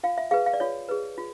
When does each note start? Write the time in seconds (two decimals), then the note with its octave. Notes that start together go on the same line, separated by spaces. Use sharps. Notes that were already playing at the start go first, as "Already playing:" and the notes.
0.03 F4 F5
0.18 E5
0.31 G#4 B4 F5
0.46 F5
0.53 D5
0.60 F4 C#5
0.89 G#4 B4
1.18 F4